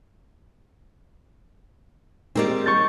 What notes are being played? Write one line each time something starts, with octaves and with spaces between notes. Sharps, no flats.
G3 G#3 A#3 C4 D#4
C#6 G6 A6